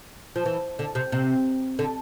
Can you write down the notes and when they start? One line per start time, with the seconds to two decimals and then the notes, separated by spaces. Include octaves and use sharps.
0.36 F3
0.46 E3
0.79 D3
0.95 C3
1.12 C3
1.79 D3